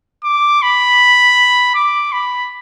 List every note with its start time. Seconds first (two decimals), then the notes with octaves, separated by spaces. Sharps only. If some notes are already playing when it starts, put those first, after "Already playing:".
0.24 D6
0.62 B5
1.75 D6
2.13 B5